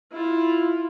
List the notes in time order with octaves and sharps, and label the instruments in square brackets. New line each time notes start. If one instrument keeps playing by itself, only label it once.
[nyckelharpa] E4 F4